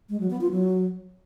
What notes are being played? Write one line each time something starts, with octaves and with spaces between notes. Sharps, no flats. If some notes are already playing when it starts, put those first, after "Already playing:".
G#3
F#3
B3
F4
F#3